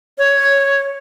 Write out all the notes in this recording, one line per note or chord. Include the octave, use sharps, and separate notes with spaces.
C#5